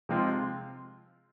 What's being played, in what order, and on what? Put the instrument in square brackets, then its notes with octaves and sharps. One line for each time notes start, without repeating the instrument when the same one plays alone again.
[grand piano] C3 F3 G#3 C4 F4